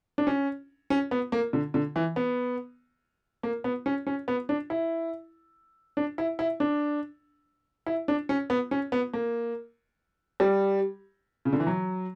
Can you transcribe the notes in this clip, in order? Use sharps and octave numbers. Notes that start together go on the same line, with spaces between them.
D4
C#4
C#4
B3
A#3
D3
D3
E3
B3
A#3
B3
C#4
C#4
B3
D4
E4
D4
E4
E4
D4
E4
D4
C#4
B3
C#4
B3
A#3
G3
C#3
D3
E3
F#3